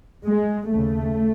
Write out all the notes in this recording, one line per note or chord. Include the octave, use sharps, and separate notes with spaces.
G#3
D#2 C#3 A3